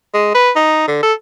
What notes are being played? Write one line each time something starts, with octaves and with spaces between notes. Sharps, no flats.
G#3
B4
D#4
D3
A4